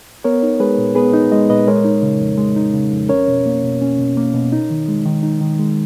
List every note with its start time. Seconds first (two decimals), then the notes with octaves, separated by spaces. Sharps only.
0.24 B3 A#4 C#5
0.43 D#4
0.60 G#3 G#4 B4
0.78 A#2
0.95 B3 G#4 B4
1.14 D#4
1.32 G#3 D#5
1.49 A#2 B4 D#5
1.68 G#3 A#4 C#5
1.85 D#4
2.02 C#3
2.21 F2
2.38 G#3
2.56 D#4
2.74 C#3
2.92 F2
3.09 C#4 A#4 C#5
3.28 B2
3.46 A#3
3.63 B2
3.81 C#4
3.99 B2
4.17 A#3
4.34 B2
4.52 D#4
4.70 D#3
4.88 G#3
5.06 D#3
5.23 D#4
5.41 D#3
5.59 G#3